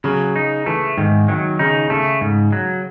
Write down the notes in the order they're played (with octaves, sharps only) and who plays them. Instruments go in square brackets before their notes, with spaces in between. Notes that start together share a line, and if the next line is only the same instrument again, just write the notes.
[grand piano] C#3 [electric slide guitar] F#3
[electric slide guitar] D#4
[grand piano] E3 [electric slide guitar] A3
[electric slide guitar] G#2 [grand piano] D#3
[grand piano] D#3 [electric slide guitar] F#3
[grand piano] C#3 [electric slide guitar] D#4
[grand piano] C#3 [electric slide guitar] A3
[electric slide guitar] G#2
F#3